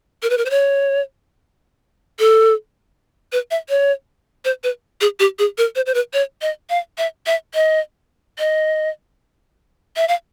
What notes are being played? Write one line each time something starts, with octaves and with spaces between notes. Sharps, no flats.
A#4
B4
A#4
C5
C#5
A4
B4
E5
C#5
C5
B4
G#4
G4
G#4
A#4
C5
C5
B4
C#5
D#5
F5
E5
E5
D#5
D#5
E5
F5